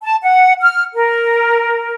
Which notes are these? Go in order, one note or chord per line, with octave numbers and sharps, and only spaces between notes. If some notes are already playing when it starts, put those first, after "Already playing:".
A5
F#5
F6
A#4